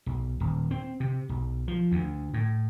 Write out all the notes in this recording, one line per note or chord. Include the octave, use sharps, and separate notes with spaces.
B1
D#1
C4
C3
B1
F3
D2
A2